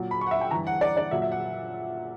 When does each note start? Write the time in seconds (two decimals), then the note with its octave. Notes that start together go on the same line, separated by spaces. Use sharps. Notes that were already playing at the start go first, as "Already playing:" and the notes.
Already playing: A#2 F#3
0.11 B5
0.21 C#6
0.26 F#5
0.31 E5
0.41 G5
0.51 G2 E3 A#5
0.67 F#5
0.81 D5
0.97 D5
1.11 A#2 F#3 E5
1.22 E5
1.32 F#5